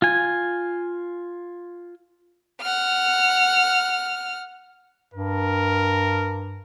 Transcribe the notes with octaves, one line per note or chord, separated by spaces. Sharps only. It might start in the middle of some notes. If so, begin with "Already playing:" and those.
F4 G#5
F#5 F6
G2 A#4